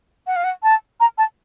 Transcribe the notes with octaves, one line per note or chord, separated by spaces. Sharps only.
F#5
F5
F#5
A5
A#5
A5